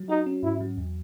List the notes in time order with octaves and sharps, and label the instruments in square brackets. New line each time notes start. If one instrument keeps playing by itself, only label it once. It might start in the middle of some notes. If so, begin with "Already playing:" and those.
Already playing: [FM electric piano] F#3
[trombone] D#4 [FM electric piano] F#4
[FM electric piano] C#4
[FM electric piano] G#2 [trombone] E4
[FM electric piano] F#3
E2